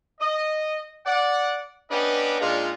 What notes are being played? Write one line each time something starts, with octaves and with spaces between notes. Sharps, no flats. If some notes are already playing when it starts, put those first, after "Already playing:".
D#5
D5 F#5
B3 C#4 D4 G4 B4 D#5
A#2 G#3 D4 D#4 F4